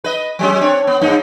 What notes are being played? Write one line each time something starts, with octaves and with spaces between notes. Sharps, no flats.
B4 D#5
F#3 G#3 C#4
C4 D4 C#5
B3
G2 A#3 D#4